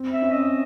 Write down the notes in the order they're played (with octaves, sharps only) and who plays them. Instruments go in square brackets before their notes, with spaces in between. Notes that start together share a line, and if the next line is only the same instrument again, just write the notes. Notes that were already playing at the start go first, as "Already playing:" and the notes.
Already playing: [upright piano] C4
[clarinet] E5
[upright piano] C#4
[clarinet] D#5